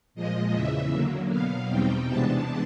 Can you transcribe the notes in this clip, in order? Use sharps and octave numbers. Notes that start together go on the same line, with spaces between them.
A#2 F3 G#3 D#5
E2 C#3 E3 E5
D3 F#3 A#3
B2 F#3 B3 F5
E2 B2 G3 C4 D#4 G5
C3 E3 G#3 B3 D4 A5